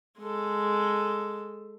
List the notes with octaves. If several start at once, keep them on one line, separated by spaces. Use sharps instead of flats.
G#3 A4